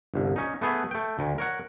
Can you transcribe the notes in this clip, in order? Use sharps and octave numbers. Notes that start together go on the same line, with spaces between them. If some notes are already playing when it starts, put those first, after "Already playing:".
G1 C2
C#4 D#4
A3 B3 G#4 B4
A3 G5
D2
A#4 C#5 F#5